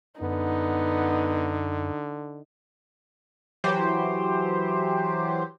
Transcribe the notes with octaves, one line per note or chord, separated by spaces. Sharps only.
F#2 D3 B3 D#4
E3 F#3 G4 C5